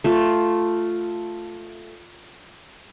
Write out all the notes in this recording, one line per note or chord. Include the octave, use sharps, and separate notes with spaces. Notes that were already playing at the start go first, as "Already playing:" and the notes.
A3 F4